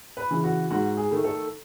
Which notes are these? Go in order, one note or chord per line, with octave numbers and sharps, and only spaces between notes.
B4
C#3 E3
F#4
G#2 F#4
G#4
D#3 A3
A4